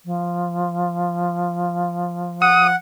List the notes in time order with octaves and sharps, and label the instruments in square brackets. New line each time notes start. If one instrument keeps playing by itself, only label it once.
[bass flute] F3
[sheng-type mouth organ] F#5 [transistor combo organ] D#6